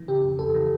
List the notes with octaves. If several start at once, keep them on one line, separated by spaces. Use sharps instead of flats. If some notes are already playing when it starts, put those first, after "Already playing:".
Already playing: E3
C#3 G4
F2
F2 A4
E3